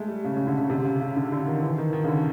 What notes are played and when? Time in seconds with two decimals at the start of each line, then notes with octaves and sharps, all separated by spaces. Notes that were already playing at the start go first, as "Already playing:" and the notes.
Already playing: G#3 A3
0.08 G3
0.24 C#3
0.36 C#3
0.47 D3
0.58 C#3
0.70 C3
0.85 C#3
1.01 C#3
1.16 D3
1.32 D3
1.47 D#3
1.63 E3
1.78 D#3
1.93 D#3
2.04 C#3
2.08 D3